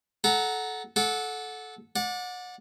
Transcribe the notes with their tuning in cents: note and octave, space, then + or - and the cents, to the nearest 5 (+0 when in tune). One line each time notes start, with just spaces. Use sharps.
A4 -25 F#5 +0 A#5 +0
A4 -20 F#5 -15 D6 +0
D5 +0 F#5 -30